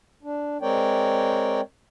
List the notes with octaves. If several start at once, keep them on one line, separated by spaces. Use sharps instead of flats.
D4
G#3 C4 A#4 C#5 D5 G5